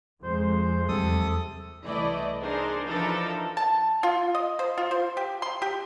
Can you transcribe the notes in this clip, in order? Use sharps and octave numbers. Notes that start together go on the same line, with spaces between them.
F2 G#3 C5
E2 C3 F#3 G3 A4 D#6
C2 E3 A3 E4 D5 D#5
D4 D#4 G#4 A#4 C5
E3 F3 D4 D#4 A4 A#4
A5
F4
D#5
C5
F4
C5
G4
C6
G4